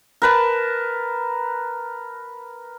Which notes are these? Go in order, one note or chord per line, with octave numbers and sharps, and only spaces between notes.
A#4 B4 A5